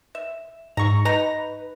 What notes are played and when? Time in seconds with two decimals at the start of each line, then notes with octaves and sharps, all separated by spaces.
0.15 E5
0.77 G#2 A#5 C#6
1.05 D#4 B4 A#5